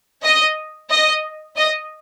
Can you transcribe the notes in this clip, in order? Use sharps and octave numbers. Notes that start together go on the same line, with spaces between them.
D#5
D#5
D#5